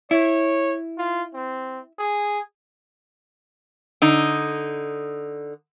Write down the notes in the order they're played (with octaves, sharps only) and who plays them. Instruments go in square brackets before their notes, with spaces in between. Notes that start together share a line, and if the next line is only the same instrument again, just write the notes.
[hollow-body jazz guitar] E4 [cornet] C#5
[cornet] F4
C4
G#4
[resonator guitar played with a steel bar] D3 D#4